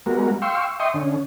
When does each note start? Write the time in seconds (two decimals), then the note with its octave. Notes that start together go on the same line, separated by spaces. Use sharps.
0.06 G3 G#3 B3 F#4 A#4
0.42 F5 G5 C6 C#6 E6
0.80 D#5 E5 G5 C6 C#6 D#6
0.94 D3 C#4